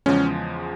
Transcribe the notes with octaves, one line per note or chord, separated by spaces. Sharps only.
E2 C#3 F3 G#3 C#4